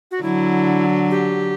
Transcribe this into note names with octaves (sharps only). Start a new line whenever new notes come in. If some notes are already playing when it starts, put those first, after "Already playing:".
F#4
D3 F#3 E4
G4